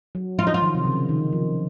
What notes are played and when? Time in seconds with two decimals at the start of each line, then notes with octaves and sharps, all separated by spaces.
0.15 F#3
0.39 F3 F4
0.47 D#4
0.54 F4
0.62 D#3
0.75 C3
0.85 C#3
1.09 D#3
1.33 F3